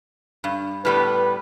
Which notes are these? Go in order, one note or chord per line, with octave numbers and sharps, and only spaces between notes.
G2
A2 G3 B3 B4